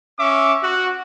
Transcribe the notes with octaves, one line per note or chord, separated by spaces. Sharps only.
C#4 E5 D6
F#4